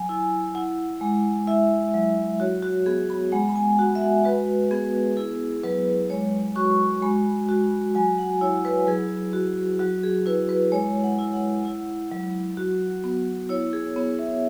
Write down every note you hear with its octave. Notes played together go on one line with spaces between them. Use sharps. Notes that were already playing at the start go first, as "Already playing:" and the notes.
Already playing: F#3 G#5
E4
E4 F#5
G#3
E4 E5
F#3
F#4 C#5
F#4
B3 G#4
B5
G#3 F#5
B5
G#5
F#4 F#5
E5
F#5
F#4 B4
B3 G#4
E4 G#4
F#3 B4
G#3 C#5
F#4 C#6
G#3 B5
F#4
F#3 G#5
F#5
E4 C#5
B4
F#3 G#4
F#4
F#3 F#4
G#4
E4 B4
B4
G#3 C#5
F#5
E4
F#5
E4
F#3
F#4
B3
E4 C#5
G#4
B3 C#5
E5